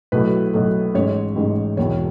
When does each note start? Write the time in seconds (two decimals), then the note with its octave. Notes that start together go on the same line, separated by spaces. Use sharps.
0.12 B1 A2 F#3 A3 B4
0.53 B1 A2 F#3 A3
0.95 A1 G#2 G#3 C#5
1.36 A1 G#2 G#3
1.77 E1 E2 B2 C#5